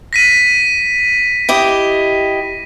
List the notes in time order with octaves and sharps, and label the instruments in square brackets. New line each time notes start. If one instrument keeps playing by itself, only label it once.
[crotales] A#6 B6 D#7
[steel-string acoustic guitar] E4 G4 D#5